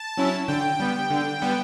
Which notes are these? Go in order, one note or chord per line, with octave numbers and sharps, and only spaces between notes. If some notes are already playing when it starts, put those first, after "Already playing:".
Already playing: A5
F#3 C#4 E4
D3 G5
G3 B3
D3
G3 B3